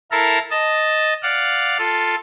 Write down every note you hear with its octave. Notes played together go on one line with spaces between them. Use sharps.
E4 A4 A#4 F5 A#5
D#5 A5
D5 F5 F#5
F4 A4